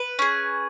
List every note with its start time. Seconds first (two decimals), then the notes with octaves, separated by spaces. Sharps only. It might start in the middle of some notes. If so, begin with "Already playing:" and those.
Already playing: B4
0.19 C#4 G#4